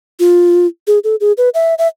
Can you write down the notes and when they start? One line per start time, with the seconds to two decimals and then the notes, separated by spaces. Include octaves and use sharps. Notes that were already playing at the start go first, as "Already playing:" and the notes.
0.20 F4
0.87 G#4
1.04 A4
1.21 G#4
1.38 B4
1.54 E5
1.78 E5